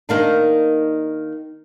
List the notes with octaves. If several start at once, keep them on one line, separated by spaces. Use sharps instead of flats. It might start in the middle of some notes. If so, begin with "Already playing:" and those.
D#3 A#3 D4